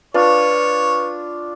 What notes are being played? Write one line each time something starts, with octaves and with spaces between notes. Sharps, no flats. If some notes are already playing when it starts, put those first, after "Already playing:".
D4 F4 B4 C#5